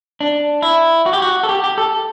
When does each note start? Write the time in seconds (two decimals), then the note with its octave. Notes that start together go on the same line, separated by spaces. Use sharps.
0.21 D4
0.62 E4
1.06 F#4
1.13 G4
1.22 F#4
1.43 A4
1.49 G4
1.64 G4
1.78 A4